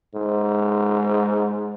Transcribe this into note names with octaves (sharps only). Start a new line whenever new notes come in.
G#2